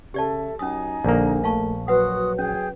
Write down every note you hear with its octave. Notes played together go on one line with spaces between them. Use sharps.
C#3 G4 A4 D5 E5 A5
F#2 C#4 D#4 G#5 D#6
A#1 D3 A#3
A3 F5 A5 C#6
F#3 F#4 B4 F#5 C6 D#6
C#4 G#4 G5 G6